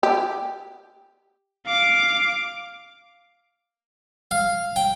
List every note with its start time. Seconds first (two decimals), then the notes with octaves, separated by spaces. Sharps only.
0.03 G4
1.66 F5 D6
4.31 F5
4.76 G5